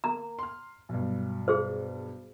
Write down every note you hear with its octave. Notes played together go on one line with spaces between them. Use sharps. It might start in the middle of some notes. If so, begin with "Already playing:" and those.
A#3 A#5
C6 F6
B1 G2
G#4 C5